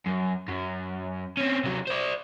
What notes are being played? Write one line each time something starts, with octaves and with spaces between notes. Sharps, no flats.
F#2
F#2
C4 C#4
C3 F#3
C5 D5